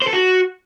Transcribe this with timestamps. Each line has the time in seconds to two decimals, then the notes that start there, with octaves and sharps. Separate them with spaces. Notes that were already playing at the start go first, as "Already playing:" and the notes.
0.02 C5
0.07 A4
0.13 F#4